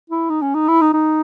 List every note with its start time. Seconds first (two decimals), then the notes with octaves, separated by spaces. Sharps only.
0.10 E4
0.30 D#4
0.42 C#4
0.54 D#4
0.68 E4
0.81 D#4
0.93 D#4